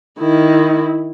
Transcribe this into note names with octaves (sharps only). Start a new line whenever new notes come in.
D#3 E4